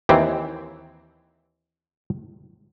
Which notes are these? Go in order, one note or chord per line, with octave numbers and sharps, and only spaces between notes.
D#2 E3 C4